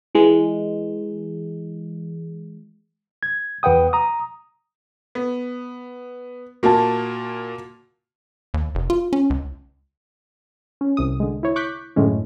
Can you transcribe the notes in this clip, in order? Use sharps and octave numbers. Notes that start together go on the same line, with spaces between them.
E3 G#3
G#6
E2 B4 F#5 G5 D#6
A#5 D#6
B3
A#2 A#3 F#4 A5
D#2
F1
F4
C#4
C#2
C#4
C2 C3 D#6
D3 G#3
E4 C#5
C#6 D6 F#6 G6 B6
F#2 A2 D3 G#3 C#4